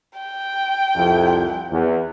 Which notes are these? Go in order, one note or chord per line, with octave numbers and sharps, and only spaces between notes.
G5
C2 F2
E2